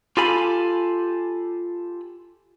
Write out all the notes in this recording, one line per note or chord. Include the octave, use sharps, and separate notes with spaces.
F4 G4 A4 F5 G#5 B5